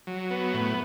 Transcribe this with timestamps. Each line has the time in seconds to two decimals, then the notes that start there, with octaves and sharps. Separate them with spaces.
0.07 F#3
0.30 B3
0.53 A2